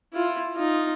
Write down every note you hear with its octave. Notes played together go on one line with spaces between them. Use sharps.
E4 F4
D#4 F4